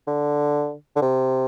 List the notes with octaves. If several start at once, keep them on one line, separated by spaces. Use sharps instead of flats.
D3
D3
C3